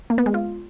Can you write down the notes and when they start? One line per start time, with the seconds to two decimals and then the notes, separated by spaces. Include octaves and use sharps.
0.10 A#3
0.18 B3
0.26 G#3
0.34 F4